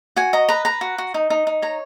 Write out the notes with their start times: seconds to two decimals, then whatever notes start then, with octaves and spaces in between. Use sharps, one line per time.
0.16 F#4 G#5
0.33 D#5 A#5
0.49 B4 A#5
0.65 B4 A#5
0.81 F#4
0.98 F#4
1.14 D#4
1.30 D#4
1.47 D#4
1.62 C#5 A#5